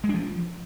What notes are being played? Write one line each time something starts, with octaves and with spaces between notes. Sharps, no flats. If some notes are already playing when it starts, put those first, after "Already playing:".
G#3
D4
F3